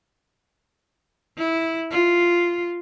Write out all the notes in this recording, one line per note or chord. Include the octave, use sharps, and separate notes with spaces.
E4
F4